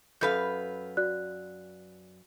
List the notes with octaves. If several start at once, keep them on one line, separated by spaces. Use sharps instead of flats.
F#2 A4 B4 F5 G6
F#4 D5 F#6